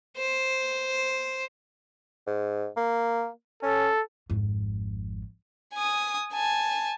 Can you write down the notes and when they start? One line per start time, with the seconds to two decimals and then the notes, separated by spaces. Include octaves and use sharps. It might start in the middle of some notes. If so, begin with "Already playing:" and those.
0.17 C5
2.27 G#2
2.77 A#3
3.63 C#4 A4
4.30 G#1 F2
5.74 G#5 D#6
6.33 G#5 A5